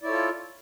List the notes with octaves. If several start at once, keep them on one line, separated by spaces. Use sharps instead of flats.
E4 F4 A4 C#5 D5